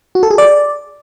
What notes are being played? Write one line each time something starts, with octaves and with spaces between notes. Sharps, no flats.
F#4
A4
G#4
D5